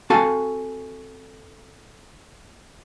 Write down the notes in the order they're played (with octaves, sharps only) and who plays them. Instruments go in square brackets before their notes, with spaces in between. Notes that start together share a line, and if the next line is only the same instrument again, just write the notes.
[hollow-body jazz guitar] C4 F#4 A4 F5 G#5 A5